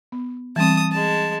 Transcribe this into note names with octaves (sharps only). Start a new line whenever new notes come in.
B3
E3 G3 C4 A5 D#6
G#3 A5